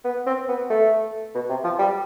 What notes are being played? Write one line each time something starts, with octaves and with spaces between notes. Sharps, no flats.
B3
C4
B3
A3
B2
C3
F3
G3